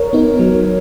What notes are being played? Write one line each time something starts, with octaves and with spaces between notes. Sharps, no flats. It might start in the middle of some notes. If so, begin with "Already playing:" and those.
Already playing: A#4 C#5
B3 D#4
F#3